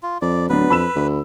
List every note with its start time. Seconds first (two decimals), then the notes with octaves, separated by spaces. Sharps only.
0.03 F4
0.21 F2 D5
0.49 D1 F#3 B3 D4 B4
0.70 F2 B5 E6 E7
0.95 D2